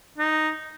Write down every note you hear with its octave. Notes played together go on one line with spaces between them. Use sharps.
D#4